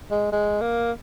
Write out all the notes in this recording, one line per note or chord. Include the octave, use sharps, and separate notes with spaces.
G#3
G#3
A#3